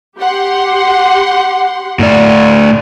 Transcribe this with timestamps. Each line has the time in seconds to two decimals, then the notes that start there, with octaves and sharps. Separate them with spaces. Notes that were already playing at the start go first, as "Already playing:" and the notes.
0.19 G4 F#5 C6
1.99 A2 A3 D5